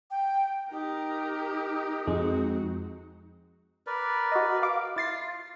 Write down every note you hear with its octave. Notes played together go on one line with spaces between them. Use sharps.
G5
D#4 G4 A#4
F2 G#3 C4 F#4
A#4 B4 D5
F#4 D#5
F5 D6
E4 F4 A6 C7